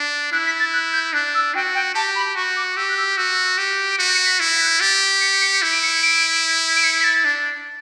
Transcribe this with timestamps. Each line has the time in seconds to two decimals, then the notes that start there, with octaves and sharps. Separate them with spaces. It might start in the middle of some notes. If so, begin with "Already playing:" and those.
Already playing: D4
0.32 E4 F#6
0.46 B6
0.60 A6
0.73 F#6
0.93 G6
1.13 D4 F#6
1.34 E6
1.54 F#4 G5
1.75 G5
1.95 G4 A5
2.15 B5
2.35 F#4 C#6
2.56 D6
2.76 G4 E6
2.88 F#6
2.97 E6
3.17 F#4 E6
3.58 G4
3.89 D7
3.98 F#4 C#7
4.12 C#7
4.26 B6
4.40 E4 C#7
4.53 B6
4.61 F#6
4.67 G6
4.80 G4 A6
5.21 C#7
5.41 C#7
5.62 E4 B6
5.72 D7
5.82 C#7
6.02 D7
6.76 D7
6.83 C#7
7.00 B6
7.04 A6
7.25 D4